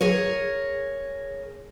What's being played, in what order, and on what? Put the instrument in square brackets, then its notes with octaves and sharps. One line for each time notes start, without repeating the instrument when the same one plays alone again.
[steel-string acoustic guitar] G#4 A#4 C#5